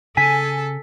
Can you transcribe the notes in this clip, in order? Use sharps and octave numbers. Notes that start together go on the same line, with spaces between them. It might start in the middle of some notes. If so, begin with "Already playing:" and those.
C#3 A4 G#5 B6